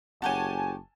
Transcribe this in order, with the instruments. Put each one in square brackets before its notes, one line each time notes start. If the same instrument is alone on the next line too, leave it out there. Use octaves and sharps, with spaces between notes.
[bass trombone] F#1 [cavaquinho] F#4 G4 C#5 [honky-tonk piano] G#5 A5